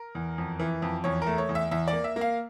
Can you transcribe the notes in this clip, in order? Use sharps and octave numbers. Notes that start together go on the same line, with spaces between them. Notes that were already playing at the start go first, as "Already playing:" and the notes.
Already playing: A#4
E2
F2
E3
F2
E2 C#5
A3 A#4
C#5
E2
E5
E2 E5
D5
A#3
E5
A#3
F5